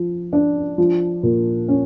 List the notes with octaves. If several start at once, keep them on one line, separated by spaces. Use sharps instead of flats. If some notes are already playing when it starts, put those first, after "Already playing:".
Already playing: F3
D4
F3
A#2
C#4